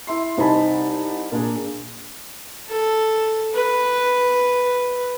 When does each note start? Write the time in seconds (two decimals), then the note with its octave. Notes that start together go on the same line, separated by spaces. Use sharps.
0.07 E4 E5 C6
0.37 C2 D#4 C5 G#5 A5 B5
1.32 A#2 D4 G#4
2.69 A4
3.53 B4